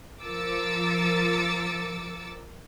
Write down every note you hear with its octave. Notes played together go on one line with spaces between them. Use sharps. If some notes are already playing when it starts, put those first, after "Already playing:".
F3 A#4 D6 E6 A6 C#7